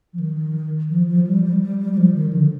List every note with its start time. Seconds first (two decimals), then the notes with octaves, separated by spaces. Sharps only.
0.13 F3
0.19 D#3
0.90 F3
1.08 F3
1.27 G3
1.44 G3
1.61 G3
1.79 G3
1.93 G3
1.97 F3
2.14 D#3
2.33 D3